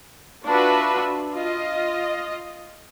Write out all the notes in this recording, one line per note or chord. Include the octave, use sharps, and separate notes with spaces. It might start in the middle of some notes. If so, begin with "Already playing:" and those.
D4 F4 F#4 B4 E5
F4 D#5